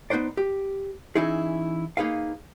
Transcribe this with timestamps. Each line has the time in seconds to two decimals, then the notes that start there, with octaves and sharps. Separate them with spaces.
0.10 B3 D#4 B4 C5 D5
0.37 G4
1.15 E3 C#4 D#4 E4 G#4
1.97 A#3 D#4 G#4 B4 F5